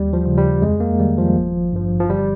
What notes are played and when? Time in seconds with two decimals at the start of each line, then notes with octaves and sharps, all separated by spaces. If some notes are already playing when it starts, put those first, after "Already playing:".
Already playing: D#2 G3
0.13 F3
0.26 C#3 F3
0.38 G3
0.62 F2 G#3
0.80 A#3
0.99 D#3 G3
1.18 F3
1.36 G#1
1.73 G2 F3
2.00 F3
2.09 G1 G3